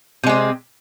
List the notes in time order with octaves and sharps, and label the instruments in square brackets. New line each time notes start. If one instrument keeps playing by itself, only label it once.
[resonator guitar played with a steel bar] C3
G#3
C4